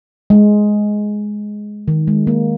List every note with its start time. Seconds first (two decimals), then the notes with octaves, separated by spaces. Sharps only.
0.30 G#3
1.88 D#3
2.08 G#3
2.27 A#3